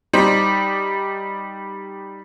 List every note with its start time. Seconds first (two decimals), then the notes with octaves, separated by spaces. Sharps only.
0.13 G3 D#4 C5 D5